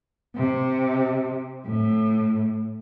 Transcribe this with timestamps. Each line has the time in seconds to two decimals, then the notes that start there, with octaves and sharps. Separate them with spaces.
0.36 C3
1.66 A2